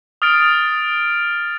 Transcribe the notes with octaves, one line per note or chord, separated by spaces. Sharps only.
D#6 F6 A6 D7